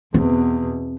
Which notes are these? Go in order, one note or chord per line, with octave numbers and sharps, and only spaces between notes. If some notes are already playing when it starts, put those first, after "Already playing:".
E2 B2 C4